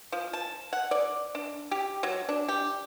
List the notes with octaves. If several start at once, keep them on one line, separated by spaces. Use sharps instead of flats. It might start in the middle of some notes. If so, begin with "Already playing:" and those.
F3
A5
F#5
D5
D4
G4
F#3
D4
G4